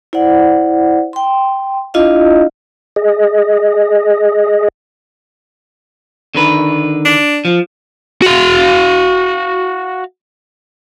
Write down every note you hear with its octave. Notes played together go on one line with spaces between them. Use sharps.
E4 C5 D5 F#5
G5 C6
D4 E4 F4 D#5 F5
G#4 D#5
D3 D#3 B4
D4
F3
F#4 F5